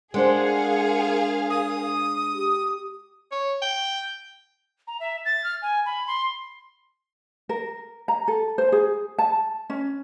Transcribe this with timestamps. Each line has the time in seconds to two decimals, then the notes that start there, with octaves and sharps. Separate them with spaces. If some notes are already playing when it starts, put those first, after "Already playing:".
0.14 G#3 D4 G#4 A#4 C5 F5 F#5
1.50 D#6
2.34 G4
3.31 C#5
3.62 G5
4.87 A#5
5.00 E5
5.25 A6
5.44 F6
5.62 G#5
5.85 B5
6.07 C6
7.49 A#4
8.08 A#5
8.28 A4
8.58 C5
8.72 G#4
9.18 A5
9.70 C#4